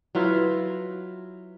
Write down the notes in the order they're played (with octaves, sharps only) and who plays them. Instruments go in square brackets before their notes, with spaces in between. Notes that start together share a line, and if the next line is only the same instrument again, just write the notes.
[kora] F#3 E4 F4 B4